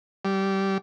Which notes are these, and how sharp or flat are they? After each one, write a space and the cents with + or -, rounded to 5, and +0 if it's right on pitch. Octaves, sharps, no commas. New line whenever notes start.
G3 -15